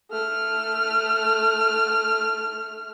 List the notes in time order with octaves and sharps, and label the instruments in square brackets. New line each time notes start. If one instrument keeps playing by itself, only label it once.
[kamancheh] A3 F6